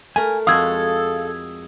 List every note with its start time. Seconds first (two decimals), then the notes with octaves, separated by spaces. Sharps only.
0.16 A3 A#4 G#5
0.47 F2 G#3 F#4 A4 F5 D#6 E6 G#6